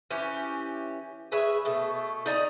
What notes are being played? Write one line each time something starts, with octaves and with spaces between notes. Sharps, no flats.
E3 C#4 G4
G#4 B4 C#5 E5
B2 A3
D#4 D5 D#5 A#5